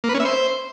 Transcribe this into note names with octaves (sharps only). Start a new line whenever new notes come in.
A#3
B4
C#4
E5
C5